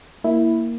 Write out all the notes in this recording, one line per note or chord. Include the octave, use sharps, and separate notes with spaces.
A#3 E4